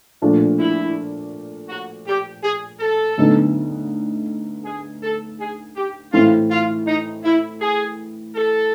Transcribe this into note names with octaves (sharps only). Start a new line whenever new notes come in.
A#2 F3 A3 D4 F4
E4
F#4
G4
G#4
A4
D2 D3 F#3 B3 D#4
G#4
A4
G#4
G4
A2 E3 A3 C4 E4 F4
F4
D#4
E4
G#4
A4